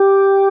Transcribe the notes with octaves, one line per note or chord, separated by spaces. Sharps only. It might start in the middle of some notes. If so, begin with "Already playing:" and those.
Already playing: G4